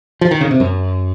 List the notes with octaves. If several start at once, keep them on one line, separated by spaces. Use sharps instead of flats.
F3
D#3
C#3
C3
F#2